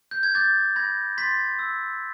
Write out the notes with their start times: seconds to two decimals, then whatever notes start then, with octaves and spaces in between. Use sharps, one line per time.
0.11 G6
0.23 G#6
0.35 D6 G6 A6
0.76 B5 G#6 A#6
1.17 C6 A6 B6
1.59 E6